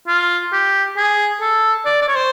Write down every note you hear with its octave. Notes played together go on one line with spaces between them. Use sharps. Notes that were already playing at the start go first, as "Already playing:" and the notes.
F4
G4
G#4
A4
D5
D5
C#5
C5